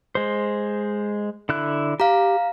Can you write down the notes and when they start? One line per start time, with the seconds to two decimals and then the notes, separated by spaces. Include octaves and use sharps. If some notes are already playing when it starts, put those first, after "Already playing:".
0.15 G#3 C5
1.49 D3 E4 F#6
2.00 G4 F5 A#5